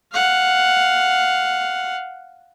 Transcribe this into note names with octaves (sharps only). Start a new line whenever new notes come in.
F5 F#5